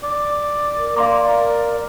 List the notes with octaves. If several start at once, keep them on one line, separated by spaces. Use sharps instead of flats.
D5
A#4
A#3 D5 F5 C6 D6
A#4